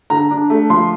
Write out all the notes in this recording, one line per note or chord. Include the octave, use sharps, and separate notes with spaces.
D3 A#5
D4
A3
F3 C6